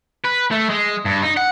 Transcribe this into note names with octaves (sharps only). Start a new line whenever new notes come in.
B4
A3
G#3
G2
D#4
F#5